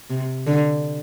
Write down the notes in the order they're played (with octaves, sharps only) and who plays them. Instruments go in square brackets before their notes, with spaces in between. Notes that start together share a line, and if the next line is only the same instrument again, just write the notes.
[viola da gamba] C3
D3